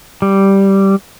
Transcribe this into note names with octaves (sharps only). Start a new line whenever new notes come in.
G3